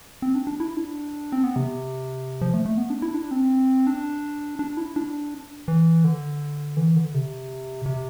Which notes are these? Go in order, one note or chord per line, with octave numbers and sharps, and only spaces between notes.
C4
D4
D4
E4
D4
C4
B3
C3
F3
A3
A3
B3
D4
E4
D4
C4
D4
D4
E4
D4
E3
D3
E3
D3
C3
C3